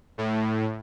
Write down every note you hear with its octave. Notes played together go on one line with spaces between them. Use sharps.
A2